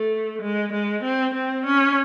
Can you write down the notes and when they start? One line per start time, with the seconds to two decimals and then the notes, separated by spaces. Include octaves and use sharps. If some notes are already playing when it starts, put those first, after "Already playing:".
Already playing: A3
0.42 G#3
0.73 G#3
1.04 C4
1.34 C4
1.66 C#4